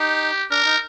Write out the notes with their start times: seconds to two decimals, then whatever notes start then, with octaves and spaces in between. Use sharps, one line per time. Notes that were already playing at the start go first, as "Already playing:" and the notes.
Already playing: D#4 G4
0.51 D4 A#4
0.65 D#4